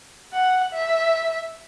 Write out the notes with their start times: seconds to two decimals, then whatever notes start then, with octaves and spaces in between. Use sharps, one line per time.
0.33 F#5
0.74 E5